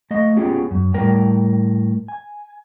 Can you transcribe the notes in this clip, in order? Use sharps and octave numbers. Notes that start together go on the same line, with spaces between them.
A3 D#5 F5
B3 C#4 F4 G4 G#4
F#2
A2 G3 A#4 G5
G#5